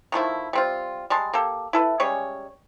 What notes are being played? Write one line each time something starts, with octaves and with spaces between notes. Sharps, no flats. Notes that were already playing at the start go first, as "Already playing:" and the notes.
D#3 F3 A3 E4
G3 C4 F4
G3 G#3 A5 C6
A#3 G4 A4
E4 A4 B4
G3 G#3 C#4 C#5